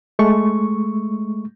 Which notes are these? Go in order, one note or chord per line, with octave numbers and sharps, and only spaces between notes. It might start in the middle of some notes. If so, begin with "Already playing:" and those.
G#3 A3 C#6